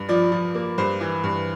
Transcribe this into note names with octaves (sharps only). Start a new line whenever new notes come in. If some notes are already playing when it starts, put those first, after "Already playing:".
Already playing: G2
F3 D5
F3
A#3
G2 C5
E3
G2